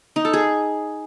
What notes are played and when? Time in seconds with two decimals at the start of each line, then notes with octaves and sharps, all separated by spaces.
0.16 D#4
0.25 A4
0.33 G#4